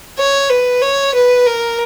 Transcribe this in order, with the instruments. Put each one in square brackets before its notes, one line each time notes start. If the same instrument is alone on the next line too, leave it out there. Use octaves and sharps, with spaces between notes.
[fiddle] C#5
B4
C#5
B4
A#4